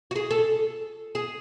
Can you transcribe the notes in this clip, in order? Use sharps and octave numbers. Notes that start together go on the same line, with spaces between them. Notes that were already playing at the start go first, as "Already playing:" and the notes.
F#4
G#4
A4
G#4